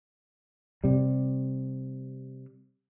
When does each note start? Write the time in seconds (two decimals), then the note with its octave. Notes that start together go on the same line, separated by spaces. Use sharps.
0.84 C3 G3